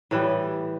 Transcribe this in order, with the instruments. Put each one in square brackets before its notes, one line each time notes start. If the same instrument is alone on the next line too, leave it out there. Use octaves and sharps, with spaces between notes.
[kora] A2 E3 G3